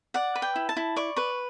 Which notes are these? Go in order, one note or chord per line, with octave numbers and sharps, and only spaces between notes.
D5 F#5
B4
G5
E4
A5
E4
D5 C#6
B4 C#6